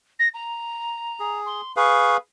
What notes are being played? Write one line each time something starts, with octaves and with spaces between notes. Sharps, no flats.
A#6
A#5
G#4
C6
G#4 B4 F5 C#6